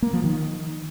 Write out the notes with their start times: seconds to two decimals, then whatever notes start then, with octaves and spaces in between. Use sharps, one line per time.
0.02 A#3
0.13 F3
0.24 D#3